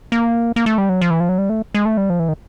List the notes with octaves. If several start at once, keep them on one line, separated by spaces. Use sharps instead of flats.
A#3
A#3
A3
G3
F#3
F3
E3
F3
F#3
G3
A3
G#3
A3
G3
F3
E3
D#3